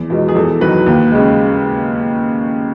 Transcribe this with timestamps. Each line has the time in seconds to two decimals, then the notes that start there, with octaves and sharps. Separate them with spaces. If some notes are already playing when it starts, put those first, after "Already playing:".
Already playing: E2
0.10 B2 G#3
0.28 G#4
0.35 E2 A4
0.61 D#3 F#3 B4
0.86 D#2
1.12 C#3 G#3